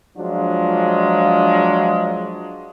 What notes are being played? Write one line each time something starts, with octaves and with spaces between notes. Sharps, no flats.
F3 F#3 G#3 D4 F4